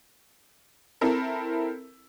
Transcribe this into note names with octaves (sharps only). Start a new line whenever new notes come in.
C4 E4 A4 A#4